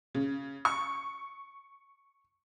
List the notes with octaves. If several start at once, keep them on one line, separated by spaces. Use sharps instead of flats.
C#3
C#6